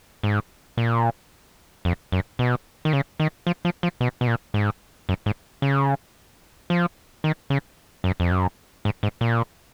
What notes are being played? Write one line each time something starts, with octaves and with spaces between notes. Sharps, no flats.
G#2
A#2
F2
F#2
B2
D#3
C#3
D#3
F3
F3
F3
B2
B2
A#2
G#2
F#2
G#2
C#3
F3
D#3
C#3
F#2
F2
F#2
G#2
G#2
A#2